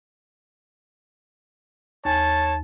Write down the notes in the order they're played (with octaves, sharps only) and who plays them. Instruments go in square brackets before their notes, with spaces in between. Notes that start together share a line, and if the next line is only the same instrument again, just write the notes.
[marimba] D#2 G#5 [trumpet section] C#5 A5